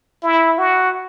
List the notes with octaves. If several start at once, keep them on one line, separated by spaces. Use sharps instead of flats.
E4
F#4